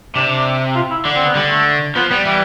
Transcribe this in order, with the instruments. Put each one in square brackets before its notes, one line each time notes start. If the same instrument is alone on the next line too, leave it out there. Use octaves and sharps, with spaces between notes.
[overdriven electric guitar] C3 [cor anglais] D4
[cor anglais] D4
F4
E4
[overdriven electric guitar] D3 [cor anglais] D4
[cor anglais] C4
B3
[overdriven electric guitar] D3 [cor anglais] G3
[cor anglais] A3
[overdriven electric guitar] F3 [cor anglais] B3
[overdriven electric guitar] G3 [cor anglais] B3
[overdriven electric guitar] E3 [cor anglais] G3